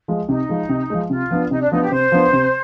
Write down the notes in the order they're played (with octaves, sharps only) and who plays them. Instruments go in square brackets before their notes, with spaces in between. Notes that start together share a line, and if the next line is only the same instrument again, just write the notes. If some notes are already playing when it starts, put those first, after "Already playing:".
[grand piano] F3 G#3
[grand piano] C3 [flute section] D#4
[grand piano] F3 G#3
C3
F3 G#3
[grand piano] C3 [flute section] F4
[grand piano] F3 B3 D4
[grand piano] C3 [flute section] D#4
[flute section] D4
[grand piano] F3 B3 D4 [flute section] D#4
[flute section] G4
[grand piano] C3 [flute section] C5
[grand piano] F3 B3 D4
C3